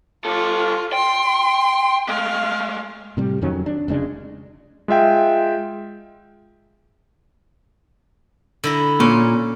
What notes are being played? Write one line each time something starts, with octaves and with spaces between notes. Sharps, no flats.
G2 F4 A4
G5 C6
G#3 A3 F5
A2 C3 G3
F2 D#3 F#3 C#4
D4
F1 C#3 G#3 D4
G#3 F4 E5 G5
D3 E4 A#5
A#2 C#4